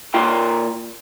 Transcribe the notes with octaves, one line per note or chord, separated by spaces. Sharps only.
A#2 F4 G5